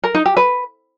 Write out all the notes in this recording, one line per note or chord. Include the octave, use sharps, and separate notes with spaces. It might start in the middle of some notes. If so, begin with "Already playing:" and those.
A#4
D#4
G4
B4